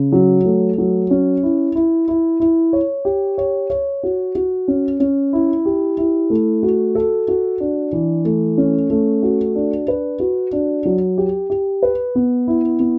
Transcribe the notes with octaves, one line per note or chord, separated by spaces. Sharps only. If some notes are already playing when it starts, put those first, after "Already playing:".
Already playing: C#3
F#3
A3
F#3
C#4
E4
E4
E4
E4
C#5
G4
C#5
C#5
F#4
F#4
C#4
C#4
E4
G4
E4
A3
F#4
A4
F#4
D4
E3
A3
C#4
A3
F#4
D4
B4
F#4
D4
F#3
G4
G4
B4
B3
E4
B3